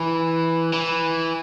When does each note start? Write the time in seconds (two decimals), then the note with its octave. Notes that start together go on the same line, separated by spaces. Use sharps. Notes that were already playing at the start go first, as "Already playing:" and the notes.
Already playing: E3
0.73 E3